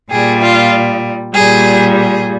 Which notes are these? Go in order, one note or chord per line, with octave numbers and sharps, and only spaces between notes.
A#2 G3 G#4
F4
A#2 G3 G#4
G#4